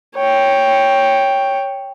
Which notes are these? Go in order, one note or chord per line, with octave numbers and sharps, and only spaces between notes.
C#5 G5